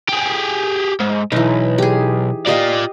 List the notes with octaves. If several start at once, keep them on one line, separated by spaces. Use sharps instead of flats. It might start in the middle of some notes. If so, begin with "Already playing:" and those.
G4 G#4
G#2
B1 E3 D#4
G4 G#4
F4 G4 D5 D#5 F5